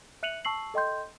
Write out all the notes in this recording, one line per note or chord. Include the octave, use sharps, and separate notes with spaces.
E5 F#6 C#7 D#7 F7 F#7
A5 C#6 E6 C7 F#7
A4 D#5 G5 C6 G6